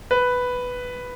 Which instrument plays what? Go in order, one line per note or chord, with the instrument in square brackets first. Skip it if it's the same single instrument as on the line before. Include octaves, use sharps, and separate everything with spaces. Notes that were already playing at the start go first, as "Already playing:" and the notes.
[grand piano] B4